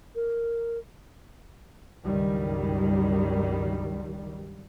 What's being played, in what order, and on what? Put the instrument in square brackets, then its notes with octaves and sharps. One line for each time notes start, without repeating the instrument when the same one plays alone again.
[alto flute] A#4
[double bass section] C#2 G2 D#3 F#3 G3